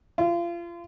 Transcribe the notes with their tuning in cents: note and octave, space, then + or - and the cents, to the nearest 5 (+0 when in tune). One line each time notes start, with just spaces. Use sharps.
F4 -30